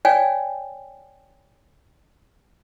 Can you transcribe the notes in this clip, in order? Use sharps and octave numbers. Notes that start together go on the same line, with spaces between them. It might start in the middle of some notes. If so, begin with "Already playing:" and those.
C#5 D5 F5 G5 G#5